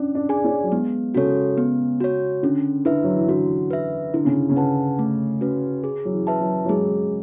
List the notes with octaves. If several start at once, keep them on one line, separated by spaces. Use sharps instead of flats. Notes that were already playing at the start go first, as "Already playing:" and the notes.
Already playing: C#4 D4
D4
G#4 D5 G#5
C#4
F#3
G#3 B3
C#3 F#4 A4 C#5
B3
F#4 C#5
D3 C#4
D3 E4 B4 E5
F#3
E3
D3 F#4
B4 E5
D3 E4
C#3
C#3
B4 F#5 A5
A3
C#4 F#4 B4
G#4
F#3
E3
B4 E5 A5
F#3
F#3
G#3 G#4